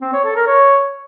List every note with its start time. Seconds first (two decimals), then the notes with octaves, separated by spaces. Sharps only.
0.02 C4
0.13 C#5
0.25 A4
0.36 A#4
0.47 C#5